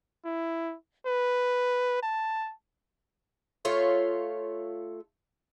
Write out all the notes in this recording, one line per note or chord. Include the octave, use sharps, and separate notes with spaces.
E4
B4
A5
A3 F4 C#5